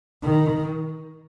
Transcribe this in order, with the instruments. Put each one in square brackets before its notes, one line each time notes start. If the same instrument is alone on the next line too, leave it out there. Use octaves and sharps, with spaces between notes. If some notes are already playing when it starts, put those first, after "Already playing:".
[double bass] D#3